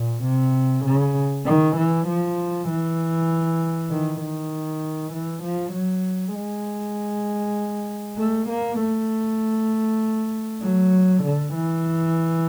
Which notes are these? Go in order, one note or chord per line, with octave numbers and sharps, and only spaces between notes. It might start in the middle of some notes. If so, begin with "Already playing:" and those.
Already playing: A#2
C3
C#3
D#3
E3
F3
E3
D#3
D#3
E3
F3
F#3
G#3
A3
A#3
A3
F#3
D3
E3